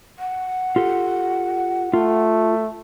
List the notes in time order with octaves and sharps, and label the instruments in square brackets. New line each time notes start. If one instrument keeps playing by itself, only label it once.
[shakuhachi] F#5
[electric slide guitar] F4 G4 A4
[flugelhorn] A3 [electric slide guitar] F4